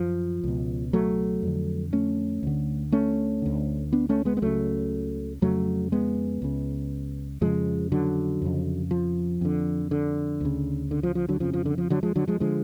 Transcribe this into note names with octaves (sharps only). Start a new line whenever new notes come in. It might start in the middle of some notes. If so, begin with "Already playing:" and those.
Already playing: F#2 F3
C#2 B2
F#3 A3
F2 D3
A3 C#4
D2 D3
A3 C#4
D2 D3
B3 D4
A3 C#4
G#3 B3
B3
C#2 C#3 F#3 A3
F2 C#3 F#3 A3
G#3 B3
C#2 C#3
F2 C#3 F3 G#3
D3 F#3
F2 C#3
F3
F2 D3
D3
D2 C#3
D3
F3
F3
D3 F#3
F2 C#3 F3
F3
D3
F3
D3 F#3
F3 G#3
D3 F#3
F3 G#3
D3 F3 G#3